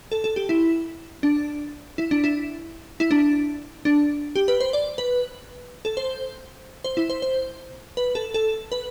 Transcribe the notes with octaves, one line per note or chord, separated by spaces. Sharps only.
A4
A4
G4
E4
D4
E4
D4
E4
E4
D4
D4
G4
B4
C5
D5
B4
A4
C5
C5
E4
C5
C5
B4
A4
A4
B4